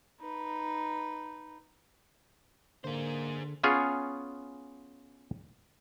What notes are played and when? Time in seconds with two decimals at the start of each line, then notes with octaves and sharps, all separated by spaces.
0.21 D#4 B4
2.84 D3 A#3 G#4 C5
3.64 B3 C#4 F4 G#4 C#5